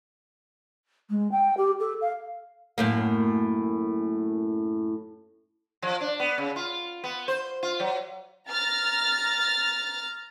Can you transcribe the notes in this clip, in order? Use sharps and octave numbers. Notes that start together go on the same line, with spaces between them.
G#3
G5
G4
A4
F5
F#2 A2 A#3
F3
D4
B3
C#3
F4
B3
C5
F4
F#3
A#5 F6 A6